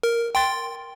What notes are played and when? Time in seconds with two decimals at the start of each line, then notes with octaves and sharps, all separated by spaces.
0.03 A#4
0.35 G5 C6 A6